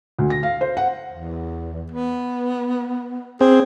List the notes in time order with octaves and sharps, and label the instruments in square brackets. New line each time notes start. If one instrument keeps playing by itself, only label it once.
[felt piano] D2
A#6
F5
C5
F#5
[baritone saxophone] E2
B3
[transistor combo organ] C4 [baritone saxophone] G#4